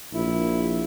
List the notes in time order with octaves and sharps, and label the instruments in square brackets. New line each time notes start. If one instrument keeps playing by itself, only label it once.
[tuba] A#1 [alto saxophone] E4